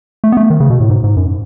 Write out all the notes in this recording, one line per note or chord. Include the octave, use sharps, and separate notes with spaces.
A3
B3
A3
D#3
C#3
B2
A2
G#2
G#2
F#2